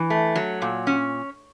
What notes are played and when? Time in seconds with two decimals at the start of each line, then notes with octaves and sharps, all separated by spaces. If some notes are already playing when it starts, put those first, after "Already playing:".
Already playing: E3
0.10 A3
0.36 F#3
0.62 A#2
0.87 C#4